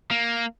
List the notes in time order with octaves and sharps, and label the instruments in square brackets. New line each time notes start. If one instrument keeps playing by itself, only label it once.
[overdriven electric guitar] A#3